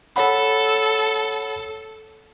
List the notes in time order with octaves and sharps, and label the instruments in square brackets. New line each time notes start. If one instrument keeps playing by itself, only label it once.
[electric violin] A4 [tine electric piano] C#5 F#5 B5